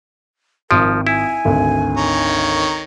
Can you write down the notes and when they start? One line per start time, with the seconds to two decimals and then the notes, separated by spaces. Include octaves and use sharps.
0.71 G#1 F3 A#4 D#6 D7
1.07 E4 G#5
1.45 G#1 D2
1.97 D#3 C#5 A#5